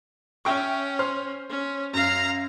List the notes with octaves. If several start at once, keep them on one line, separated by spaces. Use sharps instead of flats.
C#4 E5 G5 C#6
C5 C6 F6
C#4
F#2 F5 A#5